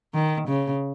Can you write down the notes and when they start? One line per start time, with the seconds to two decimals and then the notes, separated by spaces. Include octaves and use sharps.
0.14 D#3
0.47 C#3